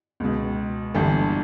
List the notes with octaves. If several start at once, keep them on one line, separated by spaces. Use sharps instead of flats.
C#2 B2
G1 G2 E3 A4